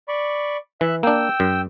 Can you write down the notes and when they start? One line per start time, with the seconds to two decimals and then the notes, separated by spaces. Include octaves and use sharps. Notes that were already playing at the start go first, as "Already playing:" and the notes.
0.08 D5 B5 C#6
0.81 E3 E5 F#6
1.03 A#3 D4 G5 E6
1.40 F#2